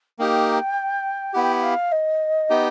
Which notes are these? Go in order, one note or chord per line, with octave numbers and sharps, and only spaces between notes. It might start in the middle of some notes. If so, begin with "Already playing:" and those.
A#3 D#4 G4 G5
B3 E4 G4 F#5
G5
F#5
F5
D#5
B3 D#4 G4